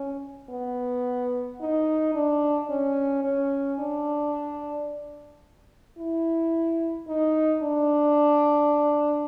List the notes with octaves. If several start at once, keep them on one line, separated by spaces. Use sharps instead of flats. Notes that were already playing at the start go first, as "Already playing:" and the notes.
Already playing: C#4
B3
D#4
D4
C#4
C#4
D4
E4
D#4
D4